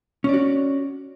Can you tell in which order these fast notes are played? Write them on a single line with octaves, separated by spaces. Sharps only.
C#4 D5 F#4